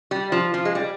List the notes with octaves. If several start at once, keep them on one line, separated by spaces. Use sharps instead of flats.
G3
F3
F3
G#3
G3